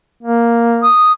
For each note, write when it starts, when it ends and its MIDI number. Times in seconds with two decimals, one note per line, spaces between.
0.23 0.87 58
0.83 1.12 87